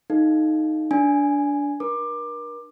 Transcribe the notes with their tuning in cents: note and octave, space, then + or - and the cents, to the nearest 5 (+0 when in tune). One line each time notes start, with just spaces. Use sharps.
D#4 +0 A4 -45 F5 +0
D4 -20 G#5 +0
D4 +30 A#4 +35 D6 +20